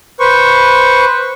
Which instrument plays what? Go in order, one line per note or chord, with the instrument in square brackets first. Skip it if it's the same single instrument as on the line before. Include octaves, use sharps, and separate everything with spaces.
[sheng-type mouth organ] B4 C5 C#6